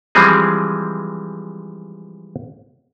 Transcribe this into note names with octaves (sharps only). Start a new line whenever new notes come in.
E3 F3 G3 G#3 C4 G#4